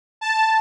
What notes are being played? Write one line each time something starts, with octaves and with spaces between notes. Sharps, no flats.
A5